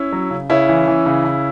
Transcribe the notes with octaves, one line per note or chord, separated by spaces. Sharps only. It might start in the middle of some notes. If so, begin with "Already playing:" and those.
Already playing: C#4 E4
F#3
C#3
C#3 C#4 E4
E3
E3
C#3
C#3